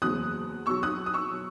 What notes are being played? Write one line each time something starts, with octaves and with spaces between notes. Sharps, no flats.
F#1 E2 B2 F#3 D#6 F#6
B1 B2 F#3 C#6 E6
D#6 F#6
D#6
C#6 E6
B2 F#3